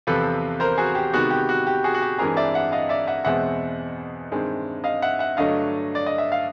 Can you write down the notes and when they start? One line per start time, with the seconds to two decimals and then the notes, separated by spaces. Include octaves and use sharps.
0.07 E2 C3 F3 A4 B4
0.60 A#4 C5
0.78 F#4 G#4
0.95 G4
1.13 C3 D#3 G#3 B3 F#4
1.30 G4
1.49 F#4
1.67 G4
1.84 F#4 G#4
1.94 F#4
2.02 G4
2.18 G2 E3 G#3 C4 G#4 A#4
2.36 D5 E5
2.54 E5 F#5
2.72 D#5 F5
2.89 D5 E5
3.07 E5 F#5
3.25 E2 B2 G#3 C4 E5 F#5
4.31 G2 D#3 G#3 C4
4.84 D#5 F5
5.02 E5 F#5
5.19 E5 F#5
5.37 G2 D3 F#3 A3 D#5 F5
5.95 D5
6.06 D#5
6.18 E5
6.32 F5